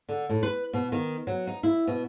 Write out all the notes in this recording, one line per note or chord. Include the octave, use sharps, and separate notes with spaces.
D3
A2
B4
B2
D#3
F#3
D#4
E4
B2